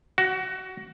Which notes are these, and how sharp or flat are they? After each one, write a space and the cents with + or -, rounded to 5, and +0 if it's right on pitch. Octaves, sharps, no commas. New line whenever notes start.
F#4 +20 F#5 +0